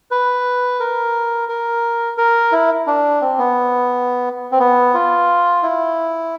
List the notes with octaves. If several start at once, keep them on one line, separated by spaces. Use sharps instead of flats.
B4
A#4
A#4
A#4
E4
D4
C4
B3
C4
B3
F4
E4